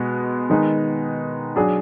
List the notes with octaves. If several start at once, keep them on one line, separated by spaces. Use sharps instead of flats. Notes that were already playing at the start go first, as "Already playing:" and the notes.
Already playing: B2 G#3 B3
D#3 G#3 B3 D#4
F#3 D4 G#4